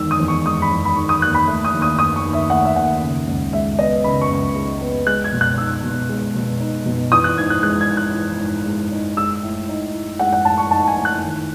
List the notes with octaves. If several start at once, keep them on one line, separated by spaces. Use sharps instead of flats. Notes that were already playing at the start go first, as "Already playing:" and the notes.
Already playing: E2 D#3 G#3 E6
D#6
E2
C#6
G#3 D#6
B5
E2
B5
D#3 C#6
D#6
D#2 F#6
B5
A3
D#6
D#2
D#6
D#3 D#6
C#6
D#2
E5
A3 F#5
E5
D#2 F#5
C#3
C#2
G#3 E5
B3 D#5
C#3 B5
C#6
C#2
G#3
B3
G#3 F#6
G#6
B2
F#6
D#4 E6
B2
G#3
B2
D#4
B2
E3 D#6
F#6
G#2 G#6
F#6
G#3 F#6
G#6
D#4
F#6
E3
G#2
G#3
D#4
G#3 E6
A2
D#4
A2
G#3 F#5
F#5
A2 A5
C#6
D#4 A5
G#5
A2
F#6
D#3